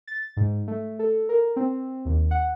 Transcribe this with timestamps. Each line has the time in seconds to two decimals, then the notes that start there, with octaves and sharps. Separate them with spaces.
0.07 A6
0.37 G#2
0.68 A3
0.99 A4
1.29 A#4
1.56 C4
2.05 D#2
2.31 F#5